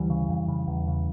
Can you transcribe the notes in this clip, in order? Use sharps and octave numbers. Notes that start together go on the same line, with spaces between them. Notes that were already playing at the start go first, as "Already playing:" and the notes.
Already playing: D2 E3 G3
C#3
F2
C#3
E2
C#3